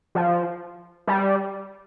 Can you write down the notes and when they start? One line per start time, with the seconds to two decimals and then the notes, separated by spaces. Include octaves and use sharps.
0.15 F3
1.07 G3